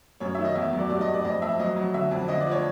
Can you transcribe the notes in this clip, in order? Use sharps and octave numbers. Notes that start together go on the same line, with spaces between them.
F#2 C#5
D#3 E5
D#5
E2 E5
F#3
D5
G2 D5
D#5
G2
D5
F2 D#5
F2 E5
F#3 D#5
F#3
D3 E5
F2
D3 D#5
D5
F3 C#5